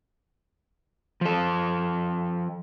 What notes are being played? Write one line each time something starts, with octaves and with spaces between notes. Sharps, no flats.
F3 A4